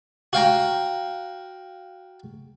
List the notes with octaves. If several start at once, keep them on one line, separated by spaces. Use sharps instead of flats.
F#4 F5 G5 A#5